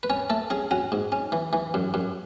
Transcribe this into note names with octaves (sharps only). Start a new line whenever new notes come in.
B4
C#4 C#5
A3 A4
C#4 G#4
C#4 F#4
G#2
C#4
E3
E3
F#2
F#2